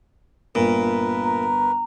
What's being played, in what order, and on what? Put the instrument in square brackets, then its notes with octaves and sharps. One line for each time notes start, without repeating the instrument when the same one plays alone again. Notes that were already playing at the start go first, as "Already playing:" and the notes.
[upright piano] G1 [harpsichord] A#2 [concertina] A#4 B4
[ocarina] A#5